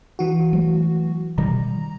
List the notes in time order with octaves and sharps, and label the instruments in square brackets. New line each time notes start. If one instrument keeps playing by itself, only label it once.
[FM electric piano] E3 F#4
[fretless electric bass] F#3 A3
[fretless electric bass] B2 D#3 G3 [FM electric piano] A#5